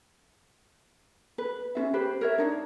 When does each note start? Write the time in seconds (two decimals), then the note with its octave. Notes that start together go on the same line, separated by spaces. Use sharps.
1.38 B4
1.75 C#4 F4 E5
1.94 G4 B4 C5
2.21 A#4 C#5 E5
2.38 D4 D#4 C#5